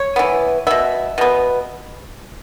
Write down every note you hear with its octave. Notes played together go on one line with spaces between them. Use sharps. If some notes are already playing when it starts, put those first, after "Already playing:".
Already playing: C#5
E3 B3
B2 B3 E5
B2 B3